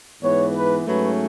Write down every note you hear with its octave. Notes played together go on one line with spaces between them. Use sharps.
G#2 E3 B3 C#5
B4
G#2 F#3 A3 C#4 B4